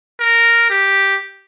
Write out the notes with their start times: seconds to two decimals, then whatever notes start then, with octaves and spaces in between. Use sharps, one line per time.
0.20 A#4
0.70 G4